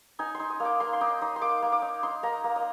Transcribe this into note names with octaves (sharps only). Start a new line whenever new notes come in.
D#4 G#5
C6
D#4
D#6
A#3
D6
A#3 C6
C6
D#4 D6
D#4 D#6
C6
A#3 D6
A#3
D6
D#4
D#4 C6
A#3 A#5
A#3
D#5